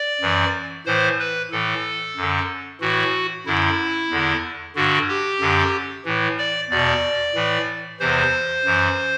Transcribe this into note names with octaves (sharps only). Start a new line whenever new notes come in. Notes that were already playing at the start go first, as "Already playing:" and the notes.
Already playing: D5
F#2 E3
A2 E3 C5
B4
A2 E3 A4
F#2 D3
A2 E3 F#4
F#2 D3 E4
E2 D3
G2 D3 F#4
G4
F#2 D3
A2 E3
D5
E2 B2 D5
A2 E3
E2 C3 E3 C5
F#2 E3